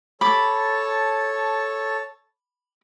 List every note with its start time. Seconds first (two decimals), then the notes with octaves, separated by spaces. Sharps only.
0.21 A4 C#5 A5 B5 D6